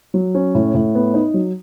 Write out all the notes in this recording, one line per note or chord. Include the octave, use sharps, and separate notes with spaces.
F#3
C#4
A2
A2
B3
D#4
F#3